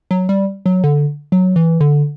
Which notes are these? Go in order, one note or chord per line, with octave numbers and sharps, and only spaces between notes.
F#3
G3
F#3
D3
F#3
E3
D3